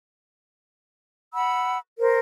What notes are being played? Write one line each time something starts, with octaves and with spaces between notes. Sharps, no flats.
F#5 B5 E6
A#4 C5